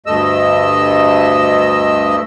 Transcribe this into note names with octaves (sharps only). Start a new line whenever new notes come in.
D2 G2 A3 D#5 E6